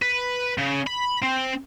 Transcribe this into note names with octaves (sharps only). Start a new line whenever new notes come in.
B4
C#3
B5
C4